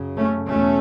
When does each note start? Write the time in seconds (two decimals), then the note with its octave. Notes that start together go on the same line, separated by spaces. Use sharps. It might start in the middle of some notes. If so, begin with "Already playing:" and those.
Already playing: F#2 C#3
0.17 A3 C#4
0.48 E2 B2 A3 C#4